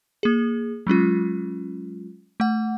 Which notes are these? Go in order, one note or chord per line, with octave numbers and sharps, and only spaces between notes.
A#3 G#4
F#3 G#3 C#4 F4
A3 F#5